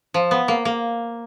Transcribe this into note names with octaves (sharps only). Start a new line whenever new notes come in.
F3
B3
A#3
A#3